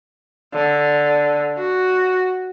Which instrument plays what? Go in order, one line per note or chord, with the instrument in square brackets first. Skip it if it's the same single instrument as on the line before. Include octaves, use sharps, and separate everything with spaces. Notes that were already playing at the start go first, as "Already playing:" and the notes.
[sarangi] D3
F#4